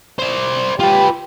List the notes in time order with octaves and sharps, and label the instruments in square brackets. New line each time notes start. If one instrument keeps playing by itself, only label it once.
[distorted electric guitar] C5 D5
[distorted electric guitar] F4 B4 [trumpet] G4